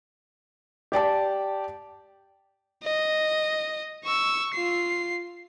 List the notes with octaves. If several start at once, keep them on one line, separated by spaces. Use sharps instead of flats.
G4 D5 G5 A5
D#5
C#6 E6
F4 C7